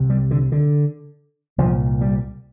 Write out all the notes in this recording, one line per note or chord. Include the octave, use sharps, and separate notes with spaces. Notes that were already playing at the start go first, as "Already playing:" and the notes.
Already playing: C2 C3
G3
D3
D3
C2 A#2 F3
G3